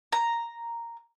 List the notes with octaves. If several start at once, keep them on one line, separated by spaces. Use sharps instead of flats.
A#5